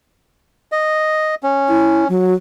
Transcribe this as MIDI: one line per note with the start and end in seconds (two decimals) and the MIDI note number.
0.72 1.35 75
1.43 2.08 61
1.68 2.04 64
2.09 2.33 54